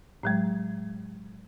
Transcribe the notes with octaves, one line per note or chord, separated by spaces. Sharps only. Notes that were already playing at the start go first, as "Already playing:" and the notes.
A2 F#3 G#3